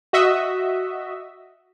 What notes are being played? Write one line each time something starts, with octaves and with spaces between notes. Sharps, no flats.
F#4 D#5 E5